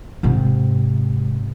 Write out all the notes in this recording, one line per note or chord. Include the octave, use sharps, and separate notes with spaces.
G#2 C3